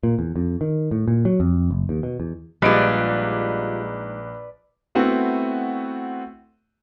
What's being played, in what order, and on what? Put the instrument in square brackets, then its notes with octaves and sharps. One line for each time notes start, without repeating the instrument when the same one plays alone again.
[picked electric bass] A#2
E2
F2
D#3
A2
A#2
F#3
F2
F#1
D#2
B2
E2
[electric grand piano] A#1 D7 [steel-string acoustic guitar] G3 F4 [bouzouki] G#3 D#4 [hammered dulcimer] B4 D5
[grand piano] A3 B3 C4 E4 F#4